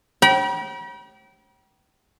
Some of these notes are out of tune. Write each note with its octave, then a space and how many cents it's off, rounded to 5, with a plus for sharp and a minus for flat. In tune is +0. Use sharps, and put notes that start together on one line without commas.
G5 -30 B5 -45